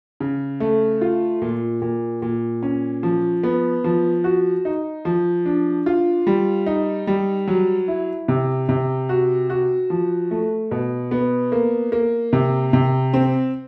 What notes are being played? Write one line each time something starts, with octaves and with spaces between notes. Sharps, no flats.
C#3
A3
F4
A#2
A#2
A#2
C#4
F3
B3
F3
F#4
D#4
F3
D4
F4
G3
D#4
G3
F#3
E4
C3
C3
F#4
F#4
F3
A3
B2
B3
A#3
A#3
C3
C3
C4